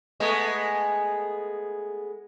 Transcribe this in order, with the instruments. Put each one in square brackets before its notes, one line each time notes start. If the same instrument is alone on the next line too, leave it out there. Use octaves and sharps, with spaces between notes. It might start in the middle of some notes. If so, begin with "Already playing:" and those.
[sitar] G#3 A3 B3